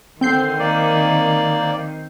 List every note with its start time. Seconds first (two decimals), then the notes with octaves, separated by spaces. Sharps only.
0.21 D3 D#3 C4 G6 C7
0.59 A#3 D5